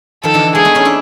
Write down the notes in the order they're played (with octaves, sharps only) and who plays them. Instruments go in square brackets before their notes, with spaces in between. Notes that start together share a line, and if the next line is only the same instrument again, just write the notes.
[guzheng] D#3 F3 [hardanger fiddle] A4
[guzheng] D3 E3
[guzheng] G#3 A#3 [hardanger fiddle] G#4
[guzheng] A3 B3
C#4 D#4
D4 E4